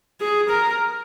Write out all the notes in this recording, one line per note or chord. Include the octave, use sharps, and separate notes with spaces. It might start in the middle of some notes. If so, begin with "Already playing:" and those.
G#4
A#4